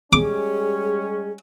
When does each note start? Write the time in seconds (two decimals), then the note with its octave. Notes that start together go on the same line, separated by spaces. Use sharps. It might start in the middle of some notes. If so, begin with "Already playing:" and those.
0.13 G3 G#3 C#4 G#4 D6